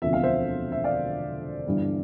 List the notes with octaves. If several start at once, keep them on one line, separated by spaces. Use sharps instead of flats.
E1 D2 C3 F3 E5
F5
C5 E5
E5
D5 F5
G1 G2 E3 G3